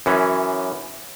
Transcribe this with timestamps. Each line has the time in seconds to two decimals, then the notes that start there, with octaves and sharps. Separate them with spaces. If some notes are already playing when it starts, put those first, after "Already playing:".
0.06 F#2 E3 C#4